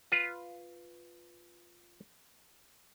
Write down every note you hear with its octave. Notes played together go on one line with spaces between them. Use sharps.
F4 B4